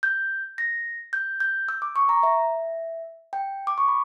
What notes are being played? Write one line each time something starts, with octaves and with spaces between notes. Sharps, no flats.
G6
A#6
G6
G6
E6
D6
C#6
A#5
E5
G5
D6
C#6
B5